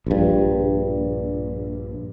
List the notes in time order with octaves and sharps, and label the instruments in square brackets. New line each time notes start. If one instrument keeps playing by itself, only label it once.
[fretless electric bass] A#1 G2